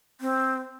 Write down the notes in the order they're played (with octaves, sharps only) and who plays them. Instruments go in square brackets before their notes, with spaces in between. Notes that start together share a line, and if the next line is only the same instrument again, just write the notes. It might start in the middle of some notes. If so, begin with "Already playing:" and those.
[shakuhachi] C4